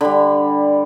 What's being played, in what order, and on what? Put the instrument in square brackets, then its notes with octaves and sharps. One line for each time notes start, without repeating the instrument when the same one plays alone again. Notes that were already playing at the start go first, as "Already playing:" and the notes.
[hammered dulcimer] D3 G3 B5